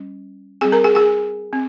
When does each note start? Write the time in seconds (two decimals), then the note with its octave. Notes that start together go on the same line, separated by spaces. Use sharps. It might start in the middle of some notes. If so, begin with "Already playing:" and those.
Already playing: G3 C#4
0.61 C4 G#4 G#5
0.65 G3
0.72 A#4 A#5
0.84 G#4 G#5
0.95 G#4 G#5
1.53 C4